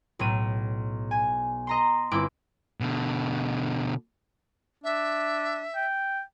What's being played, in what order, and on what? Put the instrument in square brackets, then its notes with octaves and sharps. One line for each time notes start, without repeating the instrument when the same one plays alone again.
[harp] B1 A2 D#7
G#5
D#5 A#5 C6
G1 C4 E4 D6
[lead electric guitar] B2 D3
[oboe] D4 [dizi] E5
[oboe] G5